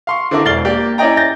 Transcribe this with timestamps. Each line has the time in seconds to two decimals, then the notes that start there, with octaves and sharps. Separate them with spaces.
0.07 F5 C6 C#6
0.31 D3 C4 D4 E4 A#4 D6
0.45 E1 D5 F6 A6 C7 G7
0.65 A#3 G4 D5
0.98 C#4 E4 D5 D#5 G5 A#5
1.17 G6 A6 A#6